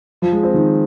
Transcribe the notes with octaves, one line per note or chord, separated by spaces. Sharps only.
F3
G#3
C4
D#3